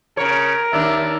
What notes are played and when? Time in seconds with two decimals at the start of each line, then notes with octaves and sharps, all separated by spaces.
0.17 C#3 A#4 C#5
0.73 D#2 D4 E5